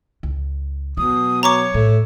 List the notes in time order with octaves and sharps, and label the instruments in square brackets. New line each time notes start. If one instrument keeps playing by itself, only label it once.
[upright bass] C#2
[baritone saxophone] B2 [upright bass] F#3 [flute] D#6
[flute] C#5 [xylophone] A#5 C#6 D6
[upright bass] A2 [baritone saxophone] A3